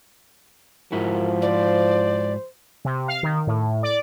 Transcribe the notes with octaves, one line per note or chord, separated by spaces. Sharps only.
G#2 F3 E4 F#4 A#4
C5 D5
C3
F5
D#3
A2
D5